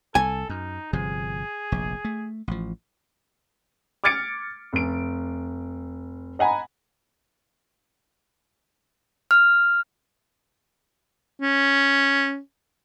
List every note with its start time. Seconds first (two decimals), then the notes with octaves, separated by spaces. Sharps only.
0.15 C2 A4 G#5
0.49 F#2 D#4
0.93 G1 C3 F3 G#4
1.72 F1 A#1
2.05 A3
2.48 A1 F3
4.04 D6 F6 G#6 A6 C#7 D7
4.73 F1 D7
6.39 D#5 F#5 G#5 A#5 B5
9.31 F6
11.42 C#4